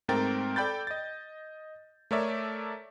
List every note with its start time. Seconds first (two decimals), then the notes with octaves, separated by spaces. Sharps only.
0.08 G#2 A3 C4 A#4 G5 A6
0.56 A4 D5 G5 B5 G6 A6
0.87 D#5 A6
2.11 A3 A4 A#4 C#5 D5 E5